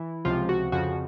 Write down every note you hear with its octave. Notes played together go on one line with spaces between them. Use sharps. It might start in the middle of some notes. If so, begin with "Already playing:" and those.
Already playing: E3 E4
C#2 C3 F3 F4
F#4
F2 C#3 F3 F#4